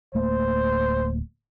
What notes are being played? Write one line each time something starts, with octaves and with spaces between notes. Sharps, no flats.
D1 A3 A#3 C5